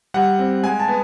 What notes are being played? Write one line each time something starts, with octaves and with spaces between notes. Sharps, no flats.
G3 F#5
C4
G#3 G#5
A5
B3